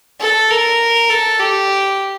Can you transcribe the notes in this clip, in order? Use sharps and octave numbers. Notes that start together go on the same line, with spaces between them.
A4
A#4
A4
G4